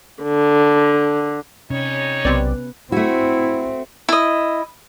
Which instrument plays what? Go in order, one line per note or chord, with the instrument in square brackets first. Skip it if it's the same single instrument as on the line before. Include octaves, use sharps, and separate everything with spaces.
[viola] D3
[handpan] C3 C#4 [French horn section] G3 D#4 C#5
[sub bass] B1 [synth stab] C3 C4 D5 [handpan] B3 B4
[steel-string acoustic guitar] A3 F#4 [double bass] C4 [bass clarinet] E4
[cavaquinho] E4 D#5